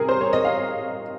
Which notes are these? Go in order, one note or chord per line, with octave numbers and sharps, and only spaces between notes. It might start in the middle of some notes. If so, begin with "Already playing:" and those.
Already playing: C3 G3 C4 G#4 A#4
C5
C#5
D#5
F5